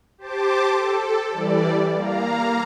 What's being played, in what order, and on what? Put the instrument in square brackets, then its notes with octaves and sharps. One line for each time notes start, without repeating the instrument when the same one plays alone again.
[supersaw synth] G4 C5 A5 D6
A4
E3 G3 D5
A#3 F5 A#5